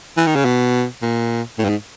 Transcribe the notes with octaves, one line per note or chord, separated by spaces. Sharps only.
E3
D#3
C#3
B2
A#2
A2
G2
G#2